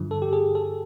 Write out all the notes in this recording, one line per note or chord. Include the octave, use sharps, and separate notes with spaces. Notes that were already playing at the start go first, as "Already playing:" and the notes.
Already playing: G2 D3 F3
A4
G4
G#4
A4